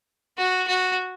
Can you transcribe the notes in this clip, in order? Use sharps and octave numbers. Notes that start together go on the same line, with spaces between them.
F#4
F#4